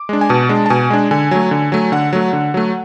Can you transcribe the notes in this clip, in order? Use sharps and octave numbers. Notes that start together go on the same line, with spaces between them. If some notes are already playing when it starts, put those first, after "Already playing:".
Already playing: D6
G#3 D4
G#5
B2 A5
G#3 D4
A5
B2 G#5
G#3 D4
D3 G#5
F#3 A3
D3
F#3 A3
D3 F#5
F#3 A3
D3
F#3 A3